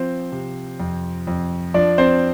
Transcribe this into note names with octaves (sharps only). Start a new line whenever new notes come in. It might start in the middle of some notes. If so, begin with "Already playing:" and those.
Already playing: F3 C4 C5
C3
F2
F2
F3 D4 D5
C4 C5